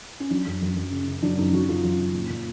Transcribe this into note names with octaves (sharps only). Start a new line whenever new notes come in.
C#4
F#3 D4
F#2
F#2
F#2
C#3
C#3
F#3 D4
F#2 D#4
F#3 F#4
F#2 F4
F#2
C#3
A#2
A#2